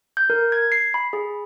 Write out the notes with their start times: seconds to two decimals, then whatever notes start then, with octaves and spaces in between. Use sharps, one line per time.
0.17 G6
0.30 A#4
0.52 G#6
0.72 C7
0.94 B5
1.13 G#4